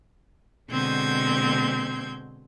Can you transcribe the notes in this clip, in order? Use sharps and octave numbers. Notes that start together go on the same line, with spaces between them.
B2 D3 G#3 C4 G6 G#6